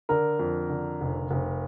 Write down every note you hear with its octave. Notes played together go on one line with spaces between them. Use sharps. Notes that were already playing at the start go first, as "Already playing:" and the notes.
D3 A#4
F2
D3
F1
F1